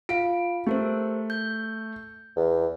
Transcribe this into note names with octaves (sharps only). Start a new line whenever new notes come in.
F4 F5 D7
A3 G4 A#4 C5
G6
E2